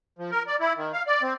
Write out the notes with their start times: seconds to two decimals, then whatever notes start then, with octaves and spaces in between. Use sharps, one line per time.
0.19 F3
0.31 A#4
0.47 D5
0.60 E4
0.77 D#3
0.93 F5
1.07 D5
1.22 C4